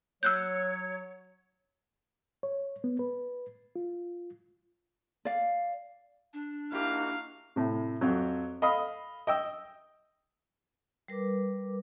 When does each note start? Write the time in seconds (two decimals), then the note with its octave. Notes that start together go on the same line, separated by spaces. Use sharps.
0.23 F#3 C#5 E6 F#6 G6
2.43 C#5
2.84 B3
2.99 B4
3.76 F4
5.25 D5 F5
6.33 D4
6.72 A#3 D#4 E4 F#4 G4 F5
7.56 A2 C3
8.01 F2 F#3
8.62 A4 D#5 F5 B5 D#6
9.27 D#5 G5 E6
11.08 G3 A#4 B4 D6